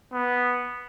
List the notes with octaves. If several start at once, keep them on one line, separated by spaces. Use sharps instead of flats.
B3